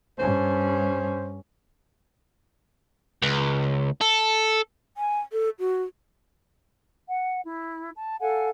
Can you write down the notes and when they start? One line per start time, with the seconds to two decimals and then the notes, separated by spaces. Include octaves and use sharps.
0.19 G2 C#4 C5
3.22 C#2
4.01 A4
4.96 G#5
5.32 A4
5.59 F#4
7.07 F#5
7.46 E4
7.96 A5
8.21 A4 F5 F#5 G#5